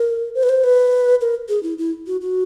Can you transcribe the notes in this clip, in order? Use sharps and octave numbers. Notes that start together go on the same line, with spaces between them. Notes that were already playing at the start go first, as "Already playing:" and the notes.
Already playing: A#4
C5
B4
C5
B4
A#4
G#4
E4
E4
F#4
F#4